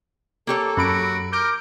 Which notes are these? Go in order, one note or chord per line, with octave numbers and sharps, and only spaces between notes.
A#3 G4 A4 C#5
F#2 F#4 B5 D7
A#4 D6 F6 G6 D7